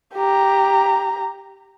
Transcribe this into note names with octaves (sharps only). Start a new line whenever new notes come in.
G4 A#5